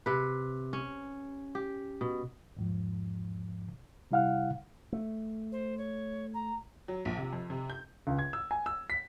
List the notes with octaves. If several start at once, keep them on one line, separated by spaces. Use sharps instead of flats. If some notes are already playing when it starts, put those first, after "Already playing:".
C3 B4
C#4
G4
B2
E2 G#2 F3
C3 G3 E4 F5 F#5 F6
A3
C5
C#5
A#5
F#3
A#1
C3
F2
C3
G6
C#2
G#6
E6
G#5
E6
B6